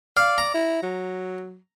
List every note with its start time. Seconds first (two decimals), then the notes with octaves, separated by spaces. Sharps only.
0.17 D5 F5
0.38 A#5
0.54 E4
0.83 F#3